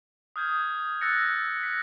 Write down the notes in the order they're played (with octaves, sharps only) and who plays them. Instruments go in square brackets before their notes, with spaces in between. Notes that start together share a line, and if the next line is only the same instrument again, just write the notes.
[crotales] D#6 F6 G6 G#6
E6 F#6 A6 A#6 C#7
A#6 B6